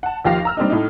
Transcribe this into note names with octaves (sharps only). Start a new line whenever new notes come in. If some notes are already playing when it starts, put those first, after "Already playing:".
F#5 A5
D#2 F3 G4 F5 A#6 F7
A#5 E6 F6
G3 C4 D4 D#4
A2 D#4